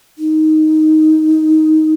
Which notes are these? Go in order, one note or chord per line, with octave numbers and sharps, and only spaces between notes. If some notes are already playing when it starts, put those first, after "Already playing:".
D#4